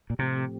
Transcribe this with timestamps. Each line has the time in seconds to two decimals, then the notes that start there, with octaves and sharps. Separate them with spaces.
0.10 A#2
0.19 A2 C3 F3 A3 C4 G4